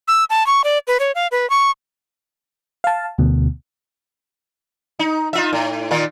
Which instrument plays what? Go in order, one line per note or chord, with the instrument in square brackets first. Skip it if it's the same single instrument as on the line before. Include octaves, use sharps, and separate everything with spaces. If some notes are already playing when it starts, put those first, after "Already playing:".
[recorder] E6
A5
C#6
D5
B4
C#5
F5
B4
C#6
[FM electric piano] F5 A5
D2 B2
[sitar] D#4
D#4 F4 E5
A2
A#2 D#3 F4